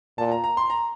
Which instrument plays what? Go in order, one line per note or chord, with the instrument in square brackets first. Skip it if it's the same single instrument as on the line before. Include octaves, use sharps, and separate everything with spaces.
[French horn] A#2 [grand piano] A5
[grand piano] A#5
A#5
C6
A#5